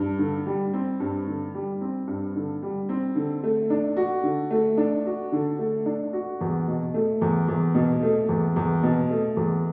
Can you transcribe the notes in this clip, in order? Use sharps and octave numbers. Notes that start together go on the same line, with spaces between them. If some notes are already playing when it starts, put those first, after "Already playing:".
Already playing: G2
D3
G3
C4
G2
D3
G3
C4
G2
D3
G3
C4
D3
A3
D4
F#4
D3
A3
D4
F#4
D3
A3
D4
F#4
E2
B2
A3
E2
E2
B2
A3
E2
E2
B2
A3
E2